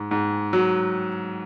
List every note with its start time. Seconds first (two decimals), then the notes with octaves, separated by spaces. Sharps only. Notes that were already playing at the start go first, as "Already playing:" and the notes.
Already playing: G#2
0.11 G#2
0.53 F#3